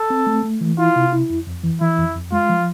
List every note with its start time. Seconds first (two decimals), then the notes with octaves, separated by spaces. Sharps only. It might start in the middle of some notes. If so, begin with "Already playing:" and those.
Already playing: A4
0.10 C4
0.27 A3
0.44 A3
0.61 E3
0.78 E4 F4
0.96 C3
1.13 E4
1.30 F2
1.47 F2
1.64 E3
1.81 E3 E4
1.98 F2
2.15 F2
2.32 G#3 F4
2.49 F3